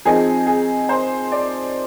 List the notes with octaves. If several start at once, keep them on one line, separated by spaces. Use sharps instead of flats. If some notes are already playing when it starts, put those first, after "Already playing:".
F3 C4 D#4 G#4
G#4
C5
D5